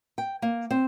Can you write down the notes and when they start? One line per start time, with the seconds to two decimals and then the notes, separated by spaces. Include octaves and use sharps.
0.18 G5
0.42 A#3
0.71 C4